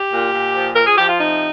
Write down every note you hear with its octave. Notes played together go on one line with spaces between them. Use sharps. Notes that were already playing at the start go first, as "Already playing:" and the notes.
Already playing: G4
A#2
A#2
F3
F3 A#4
G#4
F3 G4
F4
C3 D#4